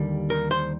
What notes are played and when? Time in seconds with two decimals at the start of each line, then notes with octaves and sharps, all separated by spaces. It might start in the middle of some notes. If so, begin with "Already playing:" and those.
Already playing: D#2 D3 G3 A#3
0.30 A#4
0.51 C5